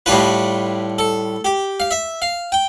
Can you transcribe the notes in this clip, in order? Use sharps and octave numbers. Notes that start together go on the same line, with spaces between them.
A2 G3 D4 F4 B4
A4
G4
F5
E5
F5
G5